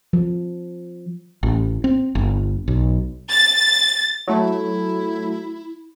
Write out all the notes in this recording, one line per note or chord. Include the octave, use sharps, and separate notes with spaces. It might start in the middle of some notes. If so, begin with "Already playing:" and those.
F3
A1
C4
G1
B1
A6
F#3 A3 E4